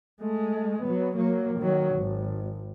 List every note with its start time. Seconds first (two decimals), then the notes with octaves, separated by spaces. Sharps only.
0.22 G#3 A3
0.83 F#3 B3
1.16 F#3 A#3
1.59 D#3 F#3
1.95 G#1